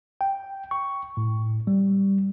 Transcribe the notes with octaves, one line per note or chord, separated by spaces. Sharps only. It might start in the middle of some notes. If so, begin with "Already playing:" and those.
G5
C#6
A2
G3